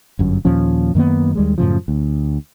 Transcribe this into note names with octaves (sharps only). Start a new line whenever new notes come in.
G1 F#2
D#2 A#2 F3 C#4
F#2 D#3 A#3 B3
D#2 G3 G#3
F#2 A2 C#3 F3
D2